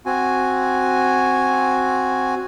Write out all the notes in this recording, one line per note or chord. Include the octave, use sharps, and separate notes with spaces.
C4 F#4 G#5